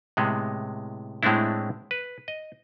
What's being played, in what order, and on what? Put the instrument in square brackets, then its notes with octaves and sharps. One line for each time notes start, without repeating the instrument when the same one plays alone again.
[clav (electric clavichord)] A2 C3 G#3 B3
A2 G#3 A3 C4 D4 E4
B4
D#5